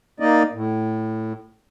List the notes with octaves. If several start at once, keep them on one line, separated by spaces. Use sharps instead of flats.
A#3 D#4 D5 D#5
A2